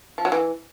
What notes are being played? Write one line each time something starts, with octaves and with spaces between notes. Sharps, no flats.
F3
F#3
E3